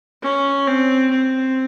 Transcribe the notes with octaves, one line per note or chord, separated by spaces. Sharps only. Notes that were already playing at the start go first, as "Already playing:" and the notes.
C#4
C4
C4